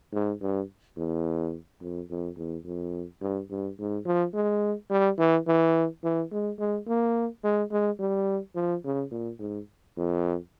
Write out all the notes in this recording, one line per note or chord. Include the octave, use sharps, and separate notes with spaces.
G#2
G2
E2
F2
F2
E2
F2
G2
G2
G#2
F3
G#3
G3
E3
E3
E3
G#3
G#3
A#3
G#3
G#3
G3
F3
C#3
A#2
G#2
F2